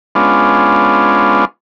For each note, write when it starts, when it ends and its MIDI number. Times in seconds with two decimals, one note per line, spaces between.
0.15 1.45 56
0.15 1.45 59
0.15 1.45 61
0.15 1.45 62
0.15 1.45 65